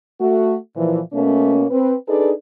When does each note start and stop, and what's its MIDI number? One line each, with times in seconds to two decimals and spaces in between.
0.20 0.55 57
0.20 0.55 66
0.76 0.99 46
0.76 0.99 52
0.76 0.99 53
1.13 1.65 47
1.13 1.65 57
1.13 1.65 58
1.13 1.65 61
1.70 1.94 60
1.70 1.94 71
2.08 2.31 62
2.08 2.31 63
2.08 2.31 68
2.08 2.31 69
2.08 2.31 71
2.08 2.31 74